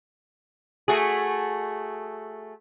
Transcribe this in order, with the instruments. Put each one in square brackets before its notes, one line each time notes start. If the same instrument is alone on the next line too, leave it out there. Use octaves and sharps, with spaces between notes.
[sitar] A3 F#4 G#4